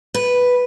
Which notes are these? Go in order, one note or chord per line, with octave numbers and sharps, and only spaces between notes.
B4